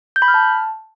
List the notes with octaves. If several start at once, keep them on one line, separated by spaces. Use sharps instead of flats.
G6
B5
F6
A5